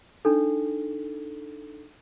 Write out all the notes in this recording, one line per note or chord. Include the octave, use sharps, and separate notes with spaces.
D4 D#4 A4